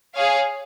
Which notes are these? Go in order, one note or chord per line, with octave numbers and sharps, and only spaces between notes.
G#4 C#5 F5